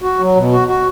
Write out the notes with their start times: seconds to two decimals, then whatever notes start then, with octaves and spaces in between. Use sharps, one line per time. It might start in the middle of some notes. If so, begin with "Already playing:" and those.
0.02 F#4
0.19 F#3
0.36 B2
0.52 F#4
0.68 F#4